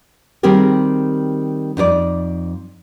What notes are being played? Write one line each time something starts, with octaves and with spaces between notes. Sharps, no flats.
D#3 G3 C4 G4 G#4 A#4
F2 D#4 A4 D5